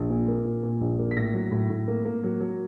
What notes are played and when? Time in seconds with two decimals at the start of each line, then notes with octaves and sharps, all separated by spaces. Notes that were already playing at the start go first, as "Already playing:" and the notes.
Already playing: A#1
0.10 A#2
0.28 A#3
0.45 A#2
0.63 A#2
0.81 A#1
0.99 A#3
1.11 B6
1.16 A2 A#6
1.34 F#3
1.51 A2
1.70 A2
1.88 A#3
2.05 A#3
2.24 F#3
2.41 F#3